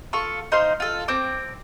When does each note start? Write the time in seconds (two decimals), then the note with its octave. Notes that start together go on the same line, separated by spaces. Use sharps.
0.13 F4 A4 C#6
0.52 D#4 C5 F5 C6
0.80 F4 A4
1.08 C4 D6